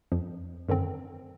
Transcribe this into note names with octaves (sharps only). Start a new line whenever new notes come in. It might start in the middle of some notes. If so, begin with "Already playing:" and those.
F2 F3
F#2 D3 D#3 C4